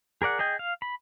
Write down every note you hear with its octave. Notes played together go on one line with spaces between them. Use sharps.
G#4 A#4 D5 F#5
G#4 D#5 G5
F5
B5